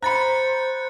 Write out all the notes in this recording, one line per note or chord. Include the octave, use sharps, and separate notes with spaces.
C5 A#5 B5 F#6 A6 C#7